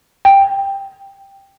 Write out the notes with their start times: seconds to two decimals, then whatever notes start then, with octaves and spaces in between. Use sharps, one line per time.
0.25 G5